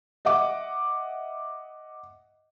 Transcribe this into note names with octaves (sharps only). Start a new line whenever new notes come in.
D#5 E5 F#5 D6